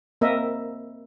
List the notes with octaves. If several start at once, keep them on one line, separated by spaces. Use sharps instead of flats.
A#3 C4 A#4 D#5 E5